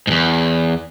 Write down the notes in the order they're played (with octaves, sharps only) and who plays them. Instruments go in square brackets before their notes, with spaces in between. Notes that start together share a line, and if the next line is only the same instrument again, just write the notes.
[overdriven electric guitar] E2 G#2